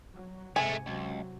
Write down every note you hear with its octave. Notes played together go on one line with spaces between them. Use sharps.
F#3
G#2 C3 G#3 A3 G#5
C#2 C3 F#3